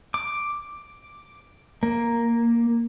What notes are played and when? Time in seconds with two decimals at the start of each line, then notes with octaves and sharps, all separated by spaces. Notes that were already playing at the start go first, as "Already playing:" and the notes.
0.14 D6
1.83 A#3